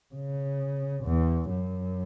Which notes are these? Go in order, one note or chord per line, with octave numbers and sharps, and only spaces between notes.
C#3
E2
F#2